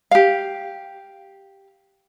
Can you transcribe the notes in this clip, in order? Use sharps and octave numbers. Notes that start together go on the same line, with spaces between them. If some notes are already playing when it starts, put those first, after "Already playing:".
G4 F5